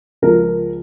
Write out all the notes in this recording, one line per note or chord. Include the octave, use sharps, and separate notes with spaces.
C#2 C#3 F3 A#4